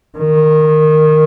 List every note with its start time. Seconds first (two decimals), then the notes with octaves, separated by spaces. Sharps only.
0.18 D#3